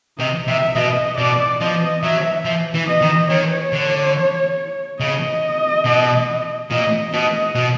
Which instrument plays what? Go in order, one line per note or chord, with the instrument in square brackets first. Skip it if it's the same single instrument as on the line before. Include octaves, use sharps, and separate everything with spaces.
[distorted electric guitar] C3 [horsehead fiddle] D#5
[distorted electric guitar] C3 [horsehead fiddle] E5
[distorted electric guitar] B2 [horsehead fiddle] D#5
[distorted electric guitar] B2 [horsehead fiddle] D5
[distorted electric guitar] F3 [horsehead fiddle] D#5
[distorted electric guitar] F#3 [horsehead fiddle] E5
[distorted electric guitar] F3
E3
[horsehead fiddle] D#5
[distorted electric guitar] D#3
[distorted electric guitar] D#3 [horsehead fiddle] C#5
[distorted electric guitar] D3
[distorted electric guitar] C#3 [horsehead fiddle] D#5
[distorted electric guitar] B2
[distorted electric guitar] A#2 [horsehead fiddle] D#5
[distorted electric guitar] B2 [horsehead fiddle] D#5
[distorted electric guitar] B2